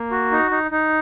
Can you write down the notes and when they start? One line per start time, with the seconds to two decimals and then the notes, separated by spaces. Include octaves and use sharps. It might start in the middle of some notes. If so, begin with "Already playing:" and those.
Already playing: A#3
0.11 F#4
0.32 D#4
0.51 D#4
0.71 D#4